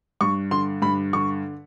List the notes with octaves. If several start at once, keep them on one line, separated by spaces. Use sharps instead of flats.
G2 C#6
D3 C6
G2 B5
D3 C#6